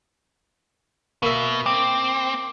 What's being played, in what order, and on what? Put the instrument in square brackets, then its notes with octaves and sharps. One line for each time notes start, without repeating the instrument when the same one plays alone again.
[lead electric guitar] B2 [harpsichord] A#3 E5
[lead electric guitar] C4 [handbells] D6